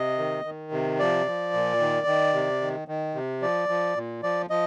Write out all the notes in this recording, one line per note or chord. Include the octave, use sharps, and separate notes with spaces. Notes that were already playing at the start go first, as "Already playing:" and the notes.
Already playing: C3 D#5
D#3
D#3
C3
F3 D5
F3
A#2
D#3
D#3
C3
D#3
D#3
C3
F3 D5
F3
A#2
F3 D5
F3 D#5